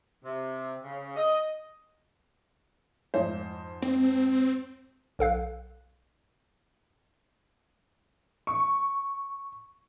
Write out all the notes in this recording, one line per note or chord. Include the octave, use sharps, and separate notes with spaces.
C3
C#3
D#5
F2 G#2 C5
C4
B1 A4 F5 F#6
C#6